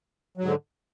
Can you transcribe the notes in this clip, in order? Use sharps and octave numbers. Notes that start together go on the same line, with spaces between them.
G#2 D3 F#3